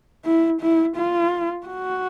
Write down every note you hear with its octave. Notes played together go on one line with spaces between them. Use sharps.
E4
E4
F4
F#4